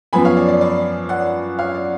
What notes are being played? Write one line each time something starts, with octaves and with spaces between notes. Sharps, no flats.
F#2 F3 B3 G#5 B5
C#5 F5
D5
D5
D5
D5 F#5
C#5 F5
D5